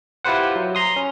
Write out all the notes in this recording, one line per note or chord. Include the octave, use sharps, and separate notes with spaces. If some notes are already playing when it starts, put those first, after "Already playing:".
E4 F4 G4 B4 C5 F#5
F#3
A#5 C6 D#6
C#4